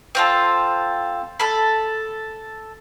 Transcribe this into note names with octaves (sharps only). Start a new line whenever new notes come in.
C4 F4 A4
A4 B5